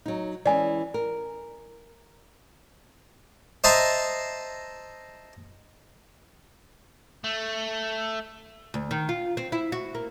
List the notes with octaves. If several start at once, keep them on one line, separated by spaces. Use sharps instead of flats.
F#3 D#4
E3 G#3 C#4 D5 G#5
A#4
C5 D#5 E5 A5 A#5 C6
A3
D2
D#3
F4
C4
E4
F#4
A#3